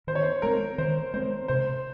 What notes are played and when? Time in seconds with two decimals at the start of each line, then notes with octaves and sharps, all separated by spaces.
0.07 D#3 C5
0.15 C#5
0.23 C5
0.42 G#3 C4 A#4
0.78 D#3 C5
1.14 G#3 C4 C5
1.48 C3 C5